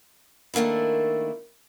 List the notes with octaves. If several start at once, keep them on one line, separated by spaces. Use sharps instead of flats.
D#3 A3 A#3 D4 E4